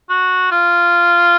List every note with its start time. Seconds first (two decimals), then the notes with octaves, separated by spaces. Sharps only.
0.09 F#4
0.52 F4